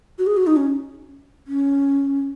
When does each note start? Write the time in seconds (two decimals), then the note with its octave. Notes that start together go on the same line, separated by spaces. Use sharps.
0.19 F#4
0.27 G#4
0.37 F#4
0.47 D#4
0.57 C#4
1.47 C#4